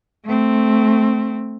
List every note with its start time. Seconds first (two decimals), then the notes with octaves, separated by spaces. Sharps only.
0.25 A3 C4